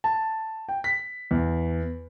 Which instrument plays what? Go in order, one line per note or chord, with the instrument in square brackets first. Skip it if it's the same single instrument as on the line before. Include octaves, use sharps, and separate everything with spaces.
[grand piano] A5
G5
B6
E2